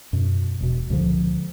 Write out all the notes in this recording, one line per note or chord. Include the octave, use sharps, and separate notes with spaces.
F#2 B2
E1 B2
C#2 A#2 D3 F3